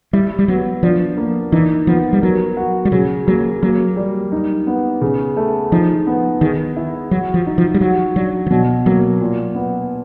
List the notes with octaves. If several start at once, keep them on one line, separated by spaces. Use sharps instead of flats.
G3 E4
G3
F#3 B3
F3 D4
A#3
E3 D#4
F3 B3
G3
F#3 A#4
F#4
G3
C#3 F#3
F#3 A#3
F#3 A#3
G3
D#4
B3
C#3
A3
F3 D#4
B3
D#3 G#4
E4
F#3 F#4
F3
D#4
F3
G3
F#3 F#4
F#3 D4
F3
B2 F#3
F#3 A#3
A#2
B3